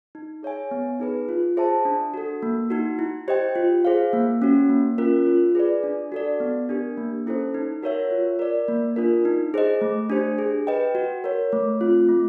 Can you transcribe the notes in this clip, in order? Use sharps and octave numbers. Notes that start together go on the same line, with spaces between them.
D#4
G#4 C#5 E5 G#5
B3
D#4 G#4 B4
F4
G#4 C5 E5 A5
D4
F#4 A4
A#3
D#4 F#4
E4
G4 C5 D#5 G5
F4
G#4 C5 F5
A#3
C#4 F#4
A#3
C#4 F4 A#4
F4
G#4 B4 D5
D4
F#4 A4 D5
B3
D4 G4 A#4
A#3
C#4 E4 A4 C5
D#4
F#4 A#4 C#5 E5
F4
A#4 D5
A#3
D4 F4 A#4
D#4
G#4 C5 D#5
A3
D4 G4 C5
G#4
B4 D#5 G5
F#4
A#4 C#5
A3
C4 F4
A3